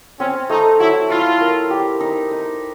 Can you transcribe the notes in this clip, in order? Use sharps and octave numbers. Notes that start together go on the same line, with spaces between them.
C4 C#4
A3 D#4
F#3 E4
E4 F4
A#4
G4
D#4
D#4